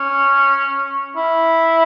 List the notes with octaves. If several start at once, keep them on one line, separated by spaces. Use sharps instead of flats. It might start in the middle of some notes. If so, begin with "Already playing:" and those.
Already playing: C#4
E4